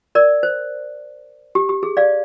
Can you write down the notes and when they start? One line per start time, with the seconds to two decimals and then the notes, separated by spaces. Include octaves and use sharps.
0.15 A#4 D5
0.43 C5
1.55 G4
1.69 G4
1.83 G#4
1.97 D5 F5